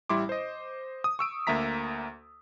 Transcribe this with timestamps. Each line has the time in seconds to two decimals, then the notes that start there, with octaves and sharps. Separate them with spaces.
0.09 A1 G3 E4 C6 D6
0.29 C5 D#5
1.04 D#6
1.19 C#6 E6 D7
1.47 D2 A#3 E5 A#5 B6